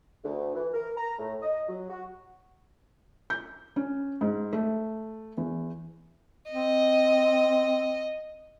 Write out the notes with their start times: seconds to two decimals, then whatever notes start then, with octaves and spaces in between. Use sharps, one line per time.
0.25 D2
0.54 E3
0.74 A#4
0.97 A#5
1.19 A2
1.41 D#5
1.68 F#3
1.90 F#4
3.30 G6
3.76 C#4
4.21 G#2
4.53 A3
5.37 E2
6.51 C4 D#5